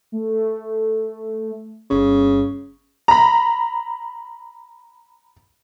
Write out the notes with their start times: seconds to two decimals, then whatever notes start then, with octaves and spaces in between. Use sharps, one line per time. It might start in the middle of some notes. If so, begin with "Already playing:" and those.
0.12 A3
1.90 G1 C#3
3.08 A#5 B5